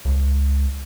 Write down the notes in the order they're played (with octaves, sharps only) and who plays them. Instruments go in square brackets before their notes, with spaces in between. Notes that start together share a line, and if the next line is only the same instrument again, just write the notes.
[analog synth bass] C#2